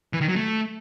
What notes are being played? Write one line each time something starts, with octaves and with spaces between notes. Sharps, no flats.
E3
D#3
F#3
A3